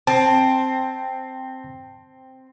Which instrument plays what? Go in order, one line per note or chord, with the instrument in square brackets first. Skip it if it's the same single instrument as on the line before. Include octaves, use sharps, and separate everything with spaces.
[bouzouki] C4 [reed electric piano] A5